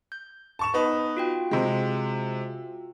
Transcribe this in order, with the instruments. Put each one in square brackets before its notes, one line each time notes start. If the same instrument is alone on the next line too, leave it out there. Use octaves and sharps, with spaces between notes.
[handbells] G6
[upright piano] A5 C#6 E7
B3 D#4 B4
[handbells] F4 F#4 G5
[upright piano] C3 G#3